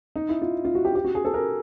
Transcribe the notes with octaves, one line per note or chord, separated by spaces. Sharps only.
D#4
E4
F4
F4
F#4
G4
G4
F#4
G#4
A4
A#4